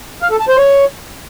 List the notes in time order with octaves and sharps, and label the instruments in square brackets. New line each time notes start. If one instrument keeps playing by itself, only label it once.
[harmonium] F5
A4
A5
C5
C#5